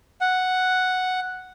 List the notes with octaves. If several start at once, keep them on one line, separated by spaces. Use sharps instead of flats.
F#5